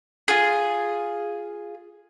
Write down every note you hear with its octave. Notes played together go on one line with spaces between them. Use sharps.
F4 G#4